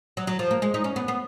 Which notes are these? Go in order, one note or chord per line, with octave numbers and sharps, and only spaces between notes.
F#3
F#3
F3
A#3
G#3
D#4
C#4
B3
B3